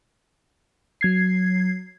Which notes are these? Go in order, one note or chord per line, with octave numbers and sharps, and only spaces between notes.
F#3 G#6 C7